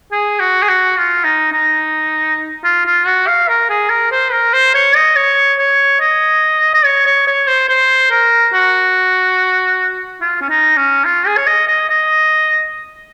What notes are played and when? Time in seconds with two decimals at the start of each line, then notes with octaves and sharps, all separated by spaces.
0.12 G#4
0.40 F#4
0.62 G#4
0.69 F#4
0.97 F4
1.24 D#4
1.52 D#4
2.64 F4
2.86 F4
3.06 F#4
3.27 F5
3.48 A#4
3.69 G#4
3.90 A#4
4.11 C5
4.32 A#4
4.54 C5
4.74 C#5
4.96 D#5
5.16 C#5
5.59 C#5
6.01 D#5
6.74 D#5
6.85 C#5
7.06 C#5
7.27 C#5
7.47 C5
7.69 C5
8.10 A#4
8.53 F#4
10.21 F4
10.41 C#4
10.49 D#4
10.77 C#4
11.05 F4
11.27 G#4
11.37 C#5
11.47 D#5
11.67 D#5
11.89 D#5